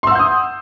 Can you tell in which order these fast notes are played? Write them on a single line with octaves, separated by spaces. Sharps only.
C6 E6 F#5 G6 D#6